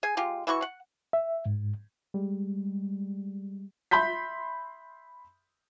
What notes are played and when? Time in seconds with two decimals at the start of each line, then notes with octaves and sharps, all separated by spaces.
0.03 G#4 G#5
0.17 G#3 F4 G4
0.47 E3 E4 F#4 C#6
0.62 F#5
1.13 E5
1.46 G#2
2.14 G3 G#3
3.91 E5 B5 C6 G6 B6